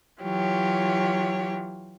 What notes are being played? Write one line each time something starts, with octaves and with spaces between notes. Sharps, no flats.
E3 F#3 F4 G4 C#5